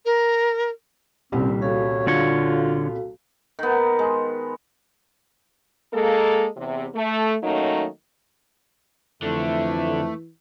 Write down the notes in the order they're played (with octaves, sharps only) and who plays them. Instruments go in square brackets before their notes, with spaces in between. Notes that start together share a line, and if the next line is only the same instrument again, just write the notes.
[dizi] A#4
[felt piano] D#1 C2 G3 [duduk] C4 [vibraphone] C#4
[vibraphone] F#4 A4 F5 [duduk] C#5
[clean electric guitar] D3 C#5 [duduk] F4
[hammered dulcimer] D#3 B3
G#3
[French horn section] G#3 A#3 A4
E2 C3
A3
D#3 F#3 A3 A#3 C#4 D#4
[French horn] F2 [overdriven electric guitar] D3 [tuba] E3 [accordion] A3